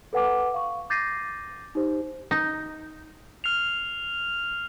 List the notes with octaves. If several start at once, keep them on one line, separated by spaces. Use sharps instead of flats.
A4 B4 F#5 G#5 D6
F5 C#6
D6 G6 A6 A#6 C7 D#7
D#4 G4 C5
D#4
F6 C7 F7